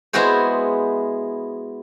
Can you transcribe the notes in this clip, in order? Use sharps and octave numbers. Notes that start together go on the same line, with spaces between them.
G#3 B3 E4 F#4 G#4 C5